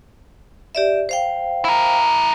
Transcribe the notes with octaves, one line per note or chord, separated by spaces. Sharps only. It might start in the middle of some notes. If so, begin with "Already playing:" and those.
G4 D5 E5
C5 F5 G5
E4 A#4